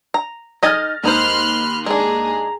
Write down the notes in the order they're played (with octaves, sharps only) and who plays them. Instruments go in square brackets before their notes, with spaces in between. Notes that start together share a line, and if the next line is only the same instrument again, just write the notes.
[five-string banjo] A#5
[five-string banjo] D#4 D#5 G#5 [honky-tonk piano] F6 A6 A#6
[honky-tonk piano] D#2 [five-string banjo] G#3 D#4 C5 [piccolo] B5 [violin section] C6 F6 F#6
[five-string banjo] G#3 D4 [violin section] G#4 [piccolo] A#5